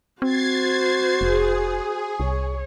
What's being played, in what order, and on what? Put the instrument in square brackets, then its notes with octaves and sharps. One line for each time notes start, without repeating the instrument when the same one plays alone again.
[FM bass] C4 [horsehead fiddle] F#4 C5 [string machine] G#6 A6 C7
[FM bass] F1 [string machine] G#4
[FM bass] C2 [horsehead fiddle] C#5